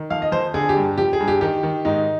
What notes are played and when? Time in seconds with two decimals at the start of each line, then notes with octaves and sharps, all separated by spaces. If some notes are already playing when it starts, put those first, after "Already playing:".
Already playing: D#3
0.10 F2 F5
0.22 D#5
0.32 F2 C5
0.54 D3 G#4
0.69 G4
0.77 G2
0.98 F3 G4
1.13 G#4
1.20 G2
1.28 G4
1.41 D#3 G4
1.63 D#3
1.85 G#2 D#4